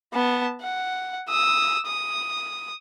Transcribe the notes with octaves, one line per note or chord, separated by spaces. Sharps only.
B3 A5
F#5
D#6 E6
D#6